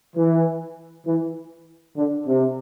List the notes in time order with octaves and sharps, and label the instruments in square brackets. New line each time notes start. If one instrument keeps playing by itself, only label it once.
[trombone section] E3
E3
D3
C3